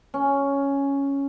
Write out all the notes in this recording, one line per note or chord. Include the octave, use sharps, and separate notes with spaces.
C#4